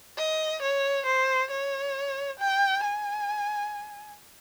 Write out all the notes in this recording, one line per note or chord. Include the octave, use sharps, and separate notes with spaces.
D#5
C#5
C5
C#5
G5
G#5